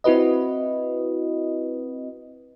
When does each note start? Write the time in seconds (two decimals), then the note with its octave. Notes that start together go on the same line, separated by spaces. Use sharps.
0.04 C4 E4 F#4 B4 D#5